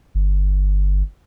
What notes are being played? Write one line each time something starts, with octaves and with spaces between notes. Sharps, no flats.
G1